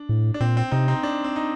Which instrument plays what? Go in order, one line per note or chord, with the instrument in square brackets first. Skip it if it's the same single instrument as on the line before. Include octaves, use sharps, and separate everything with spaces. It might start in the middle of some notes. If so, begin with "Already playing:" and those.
Already playing: [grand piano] D4
[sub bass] A2
[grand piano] D4
[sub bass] A#2 [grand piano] C4
[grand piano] C4
[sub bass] C3 [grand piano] C4 D#4
[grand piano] C4 D#4
D4
C4
D#4